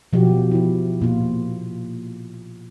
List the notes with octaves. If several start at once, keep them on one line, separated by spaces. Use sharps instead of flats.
B2 F3 F#4 G4
F3 E4
A#2 F4